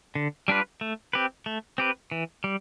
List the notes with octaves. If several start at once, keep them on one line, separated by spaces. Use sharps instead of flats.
D3
G3 D4 F4 B4
A3
C4 G4 B4
A3
C4 G4 B4
E3
G3